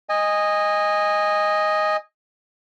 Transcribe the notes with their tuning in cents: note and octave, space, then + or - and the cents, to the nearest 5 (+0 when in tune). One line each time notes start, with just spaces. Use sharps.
D#5 +0 G#5 -20